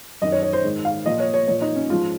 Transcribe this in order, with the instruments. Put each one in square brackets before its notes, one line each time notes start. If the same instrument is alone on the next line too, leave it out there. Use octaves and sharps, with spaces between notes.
[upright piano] F#2 D#3 D#5
C#5
C#5
C5
G#2 D#3
F5
A#2 F3 D#5
C#5
C#5
A#2 F3 C#5
D#4
C#4
G#2 F3 F4